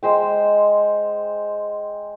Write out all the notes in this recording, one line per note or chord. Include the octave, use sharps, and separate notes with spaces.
G#3 C5 G5